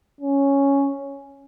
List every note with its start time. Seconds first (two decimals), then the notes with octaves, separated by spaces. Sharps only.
0.21 C#4